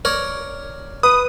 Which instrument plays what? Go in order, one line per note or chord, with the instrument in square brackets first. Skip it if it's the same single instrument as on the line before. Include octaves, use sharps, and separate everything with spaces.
[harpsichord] A#4 C#5 D5
[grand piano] B4 [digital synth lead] D#6